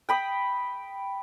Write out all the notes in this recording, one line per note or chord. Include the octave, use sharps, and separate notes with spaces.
G5 B5 D#6